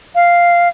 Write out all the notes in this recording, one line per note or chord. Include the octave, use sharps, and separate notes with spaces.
F5